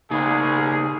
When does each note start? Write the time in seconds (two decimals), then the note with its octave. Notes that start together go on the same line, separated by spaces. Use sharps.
0.11 C2 C#3 A#3 D#4 G#4